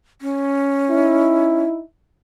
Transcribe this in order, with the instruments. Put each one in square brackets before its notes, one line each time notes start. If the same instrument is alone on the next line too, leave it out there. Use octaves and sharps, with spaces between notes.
[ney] C#4
[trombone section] D#4 E4